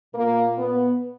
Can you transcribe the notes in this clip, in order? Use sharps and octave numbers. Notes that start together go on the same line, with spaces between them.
A#2 A#3
B3